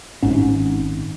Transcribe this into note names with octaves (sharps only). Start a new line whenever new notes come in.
G#1 G#2 C#4